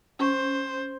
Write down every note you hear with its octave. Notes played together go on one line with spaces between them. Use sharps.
C#4 C5 C#6